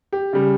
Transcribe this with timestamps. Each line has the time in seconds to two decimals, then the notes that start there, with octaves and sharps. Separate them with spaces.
0.13 G4
0.33 C#3 G3